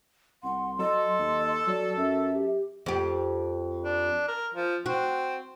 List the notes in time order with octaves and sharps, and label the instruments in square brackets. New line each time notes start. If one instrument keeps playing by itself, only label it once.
[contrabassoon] C2 [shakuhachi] F#5 [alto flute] C6
[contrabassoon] F#3 [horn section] A4 [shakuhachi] D#5
[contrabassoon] D#2
[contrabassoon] F#3 [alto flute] F#4 [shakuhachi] D5
[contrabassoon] F#2 [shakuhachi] E5
[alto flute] G4
[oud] F2 G4
[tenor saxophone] D4
A#4
F3
[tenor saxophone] C4 [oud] F#4